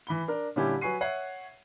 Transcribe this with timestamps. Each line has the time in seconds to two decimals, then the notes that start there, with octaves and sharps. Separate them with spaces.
0.07 E3 B5 G7
0.28 D4 A#4
0.56 A#2 D3 G3 C#4 E4 G4
0.81 F#3 B4 G#5 C#6 C7 D#7
1.01 C#5 E5 F#5 C7